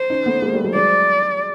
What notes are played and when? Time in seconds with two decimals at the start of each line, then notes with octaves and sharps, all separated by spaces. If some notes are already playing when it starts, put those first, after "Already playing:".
Already playing: C5
0.10 C#4 D#4
0.26 A3 B3
0.42 G#3 A#3
0.53 G3 A3
0.64 F#3 G#3
0.74 F#3 G#3 D5